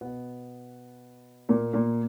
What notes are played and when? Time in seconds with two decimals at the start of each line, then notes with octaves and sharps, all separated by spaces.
0.01 B2 B3
1.49 A#2 A#3
1.73 A#2 A#3